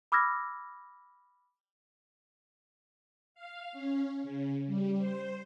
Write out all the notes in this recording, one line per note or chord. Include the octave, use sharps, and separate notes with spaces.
B5 D6 E6 F6 G#6 A#6
F5
C#4
C#3
G3
C5